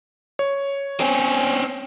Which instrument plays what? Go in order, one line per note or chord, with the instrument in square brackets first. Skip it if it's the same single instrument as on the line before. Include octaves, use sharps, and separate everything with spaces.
[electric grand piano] C#5
[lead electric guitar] C4 C#4